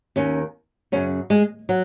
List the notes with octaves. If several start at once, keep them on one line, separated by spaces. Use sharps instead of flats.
D#2 D#3 C#4
F#2 C#3 C#4
G#3
F#3